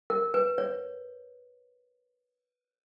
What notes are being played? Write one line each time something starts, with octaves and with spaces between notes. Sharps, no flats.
A#4
B4
C#5